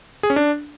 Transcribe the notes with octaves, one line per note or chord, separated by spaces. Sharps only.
G#4
C#4
D4